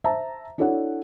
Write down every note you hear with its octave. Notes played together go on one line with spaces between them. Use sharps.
C5 E5 A5 A#5
D4 E4 F#4 A4 C#5 F#5